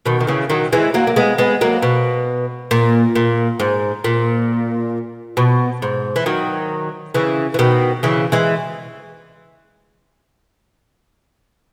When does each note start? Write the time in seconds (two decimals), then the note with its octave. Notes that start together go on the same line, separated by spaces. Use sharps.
0.06 B2 D#3
0.20 D#3
0.27 C#3 E3
0.50 D#3 F#3
0.73 E3 G#3
0.94 F#3 A#3
1.07 A#3
1.16 G#3 B3
1.38 G#3 B3
1.61 F#3 A#3
1.82 B2
2.71 A#2
3.15 A#2
3.60 G#2
4.04 A#2
5.37 B2
5.82 G#2
6.16 E3
6.26 D#3 F#3
7.14 C#3 E3
7.54 E3
7.59 B2 D#3
8.03 C#3 E3
8.32 E3 G#3